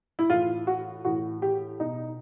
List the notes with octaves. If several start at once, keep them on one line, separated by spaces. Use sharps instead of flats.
E4
A2 E3 F4
F#4
A2 E3 F#4
G4
B2 D#4